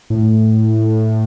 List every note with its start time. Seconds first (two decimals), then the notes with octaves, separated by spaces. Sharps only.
0.10 A2